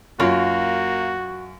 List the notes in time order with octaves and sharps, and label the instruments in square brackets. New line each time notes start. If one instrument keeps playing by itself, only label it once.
[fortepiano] F#2 C#5 [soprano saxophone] A#3 [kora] F4 [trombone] F#4